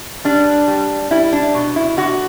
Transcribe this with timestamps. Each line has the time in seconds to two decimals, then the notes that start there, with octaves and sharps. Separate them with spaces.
0.25 G3 D4
0.68 G3
1.11 G3 E4
1.33 D4
1.54 B2
1.76 E4
1.97 D3 F#4